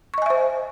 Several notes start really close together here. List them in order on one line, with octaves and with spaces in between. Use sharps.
C#6 D#5 G#5 E5 C5